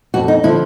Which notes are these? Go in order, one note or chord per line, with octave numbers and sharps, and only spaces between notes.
F2 F#4
D#4
D3 F3 E4